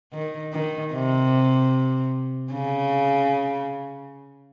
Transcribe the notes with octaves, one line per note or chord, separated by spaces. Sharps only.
D#3
D#3
C3
C#3